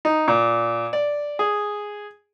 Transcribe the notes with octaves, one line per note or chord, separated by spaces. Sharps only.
D#4
A#2
D5
G#4